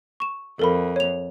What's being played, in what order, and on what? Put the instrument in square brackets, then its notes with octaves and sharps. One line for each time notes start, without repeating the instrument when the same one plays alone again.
[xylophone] C#6 E7
[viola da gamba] F2 [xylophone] A4 A#4 B5
[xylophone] C#5 F7